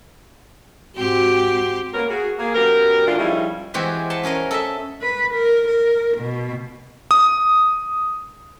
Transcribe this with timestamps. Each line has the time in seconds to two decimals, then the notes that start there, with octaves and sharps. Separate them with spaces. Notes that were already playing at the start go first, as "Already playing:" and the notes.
0.96 G#2 C4 F#4 G4 C6
1.94 A#3 B3 C#4 A#4
2.09 F#4 G#4
2.39 A#3 G#4
2.55 F#2 B3 G4 A#4
3.07 A2 E3 D4 F4
3.19 F3 G3 G#3 C#4 D#4 E4
3.74 E3 G#3 C4 F#4 G4
4.10 B4 F#5 A5 C6
4.24 C#4 G#4 A#4 D#5
4.51 A4 D#5 E5
5.01 B4
5.33 A#4
5.67 A#4
6.18 B2
7.11 D#6